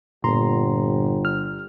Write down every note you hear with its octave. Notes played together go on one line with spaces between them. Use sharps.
G1 A#2 A#5 C6
F6